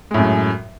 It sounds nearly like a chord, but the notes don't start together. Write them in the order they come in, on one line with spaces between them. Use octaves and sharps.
G#3 A2 F#2